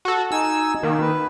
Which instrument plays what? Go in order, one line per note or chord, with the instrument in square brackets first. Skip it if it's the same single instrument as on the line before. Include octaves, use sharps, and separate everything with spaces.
[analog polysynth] F#4 A4
[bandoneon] D#4 G#5 [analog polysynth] E6
[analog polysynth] D#3 [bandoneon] A#3
[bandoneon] B4